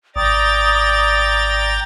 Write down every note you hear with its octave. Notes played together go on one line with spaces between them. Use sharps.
G#1 D5 G5 A#5 D#6 A6